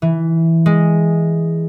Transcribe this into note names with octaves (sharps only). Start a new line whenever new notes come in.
E3
G#3